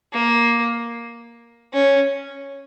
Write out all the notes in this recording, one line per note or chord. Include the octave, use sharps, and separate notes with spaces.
A#3
C#4